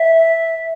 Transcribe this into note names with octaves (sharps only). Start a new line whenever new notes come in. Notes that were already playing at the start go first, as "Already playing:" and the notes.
Already playing: E5